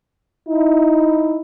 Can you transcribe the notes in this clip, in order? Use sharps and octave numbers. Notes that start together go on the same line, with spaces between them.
D#4 E4